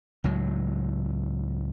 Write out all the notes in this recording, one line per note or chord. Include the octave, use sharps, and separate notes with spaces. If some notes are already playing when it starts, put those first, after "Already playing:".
C#2 A2 F#3